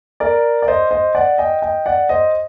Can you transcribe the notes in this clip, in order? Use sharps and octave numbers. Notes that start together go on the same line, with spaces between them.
A#4 D5
D5
C5 D#5
C5 D#5
D5 F#5
D#5 G5
D#5 G5
D5 F#5
C5 D#5